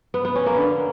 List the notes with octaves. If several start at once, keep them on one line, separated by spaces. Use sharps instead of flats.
B3
B3
C#4
A#3
D3